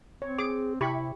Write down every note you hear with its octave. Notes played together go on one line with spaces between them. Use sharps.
C4 C#5
G#4 D6
C3 E4 G4 B5 C#6